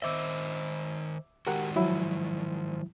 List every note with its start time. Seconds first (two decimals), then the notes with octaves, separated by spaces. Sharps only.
0.02 D#3 C5 D#5 E5 D6 E6
1.47 D#3 G#3 F#4 G4 A#4 F#5
1.76 F3 F#3 E4